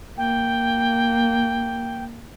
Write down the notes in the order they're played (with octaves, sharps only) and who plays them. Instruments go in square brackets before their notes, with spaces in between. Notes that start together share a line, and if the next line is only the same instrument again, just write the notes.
[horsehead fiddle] A#3 [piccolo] G5